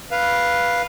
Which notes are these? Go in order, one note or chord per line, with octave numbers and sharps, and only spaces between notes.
B4 F5